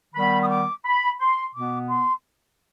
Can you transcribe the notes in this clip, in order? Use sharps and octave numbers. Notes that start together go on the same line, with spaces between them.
D#3 G3 B3 B5
D#6
D6
B5
C6
B2 B3 D6
C6